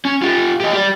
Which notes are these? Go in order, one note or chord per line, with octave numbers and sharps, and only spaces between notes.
C#4
F4 G4
G4 D#5
G4 D5